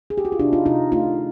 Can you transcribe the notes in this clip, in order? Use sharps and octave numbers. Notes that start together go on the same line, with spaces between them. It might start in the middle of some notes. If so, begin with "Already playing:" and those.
G#4
G4
F#4
F4
C3 D4 E4
D#4 F4
C3 D#4 F4
A3 D#4 F4